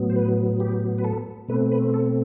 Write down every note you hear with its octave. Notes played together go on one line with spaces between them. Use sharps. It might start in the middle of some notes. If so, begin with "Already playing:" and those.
Already playing: A2 F#3 B3
C5
B4
G4
B4
A4
B2 A3 C4 B4
B4
A4